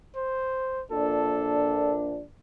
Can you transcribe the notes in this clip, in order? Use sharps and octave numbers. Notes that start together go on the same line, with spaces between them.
C5
A#1 A#2 D4 A4